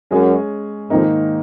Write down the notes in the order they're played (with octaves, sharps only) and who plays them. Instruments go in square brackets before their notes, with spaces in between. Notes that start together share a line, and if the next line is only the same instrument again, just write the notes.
[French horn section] F#2 [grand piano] G#3 C#4 G#4 C#5
[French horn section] F2 [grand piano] G#2 D#3 A#3 D#4 A#4